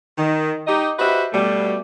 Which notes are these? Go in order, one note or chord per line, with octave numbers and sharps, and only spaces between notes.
D#3
D#4 G4 D#5
F#4 G4 B4 C5 D#5 E5
B2 G3 A3